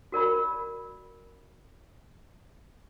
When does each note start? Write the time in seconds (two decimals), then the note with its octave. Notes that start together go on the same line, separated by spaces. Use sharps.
0.12 F#4 A#4 D5 B5